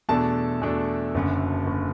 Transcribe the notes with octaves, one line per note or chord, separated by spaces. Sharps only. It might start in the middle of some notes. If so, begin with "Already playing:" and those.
E2 B2 A3 D4 A4 A5
E2 B2 A3 D4
F#1 F#2 D3
F#1 D3